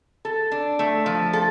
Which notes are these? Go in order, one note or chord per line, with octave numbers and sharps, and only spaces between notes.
A4
D4
A3
F3
A4